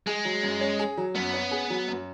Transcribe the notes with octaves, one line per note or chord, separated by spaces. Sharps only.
G#3 G#4
F#3
F#2
C#4
G#4
F#3
F#2 B3
C#4
G#4
F#3
F#2